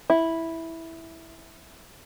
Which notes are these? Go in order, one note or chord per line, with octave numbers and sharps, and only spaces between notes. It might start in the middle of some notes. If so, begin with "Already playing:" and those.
E4